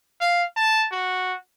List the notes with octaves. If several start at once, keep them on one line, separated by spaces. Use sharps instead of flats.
F5
A5
F#4